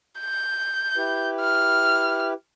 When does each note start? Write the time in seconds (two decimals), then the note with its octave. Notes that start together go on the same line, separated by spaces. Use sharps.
0.20 G6
0.97 E4 G4 B4
1.41 F6